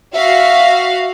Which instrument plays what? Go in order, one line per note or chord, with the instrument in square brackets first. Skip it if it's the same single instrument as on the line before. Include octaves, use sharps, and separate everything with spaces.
[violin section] F#4 F5 [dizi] E5